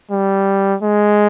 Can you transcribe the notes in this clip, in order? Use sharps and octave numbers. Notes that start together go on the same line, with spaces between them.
G3
G#3